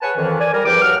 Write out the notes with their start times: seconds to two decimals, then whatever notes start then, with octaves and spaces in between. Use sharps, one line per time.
0.02 G#4 B4 C#5 F#5 G#5 A5
0.17 F2 D#3 E3
0.41 D5 G#5
0.54 G3 A#4
0.65 E2 G2 F3 G5 D6
0.82 G2 F#3 F#5 F6